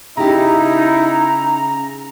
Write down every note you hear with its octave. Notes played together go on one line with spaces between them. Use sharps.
C#3 D#4 E4 G4 A#5